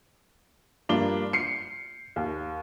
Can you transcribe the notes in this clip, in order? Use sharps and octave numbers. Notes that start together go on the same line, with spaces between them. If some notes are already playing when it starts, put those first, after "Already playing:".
G2 A#3 D4 F4 G7
C7 C#7
D#2